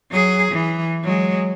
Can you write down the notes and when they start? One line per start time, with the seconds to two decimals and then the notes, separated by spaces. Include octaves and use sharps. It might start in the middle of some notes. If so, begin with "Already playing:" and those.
0.11 F#3 G#4
0.52 E3
1.04 F#3 G#3